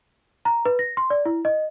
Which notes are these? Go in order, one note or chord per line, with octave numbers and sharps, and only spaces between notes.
A#5
B4
A#6
C6
D5
E4
D#5